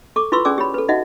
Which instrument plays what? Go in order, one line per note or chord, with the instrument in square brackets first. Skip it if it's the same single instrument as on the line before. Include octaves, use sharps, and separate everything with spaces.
[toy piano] A4 C#6 D6
E4 F4 B4 C6 C#6 E6
C#4 G#4 D5 G#5 D6 E6
G4 C#5 B5
A4 B4
D#4 F#4 D#5 E5 F#5